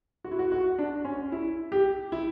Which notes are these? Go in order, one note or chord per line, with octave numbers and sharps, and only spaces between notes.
F#4
E4
F#4
F#4
D4
C#4
E4
G4
E4